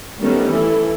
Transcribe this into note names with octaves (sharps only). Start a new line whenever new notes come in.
D#3 G3 A3 B3 C#4
E3 E4 A4